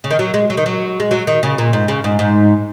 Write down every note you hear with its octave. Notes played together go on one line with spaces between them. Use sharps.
C#3
D#3
F#3
G#3
F#3
D#3
F#3
G#3
F#3
D#3
C#3
A#2
G#2
C#3
G#2
G#2